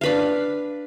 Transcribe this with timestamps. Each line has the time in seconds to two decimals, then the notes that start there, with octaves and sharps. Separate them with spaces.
0.01 D4 B4 F5